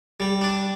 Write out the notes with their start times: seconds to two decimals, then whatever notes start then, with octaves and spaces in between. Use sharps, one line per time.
0.20 G3
0.41 D4